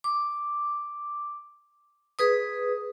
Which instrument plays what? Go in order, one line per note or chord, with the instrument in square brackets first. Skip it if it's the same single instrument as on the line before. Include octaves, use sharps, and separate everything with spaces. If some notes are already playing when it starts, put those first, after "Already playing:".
[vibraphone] D6
G#4 B4 D#6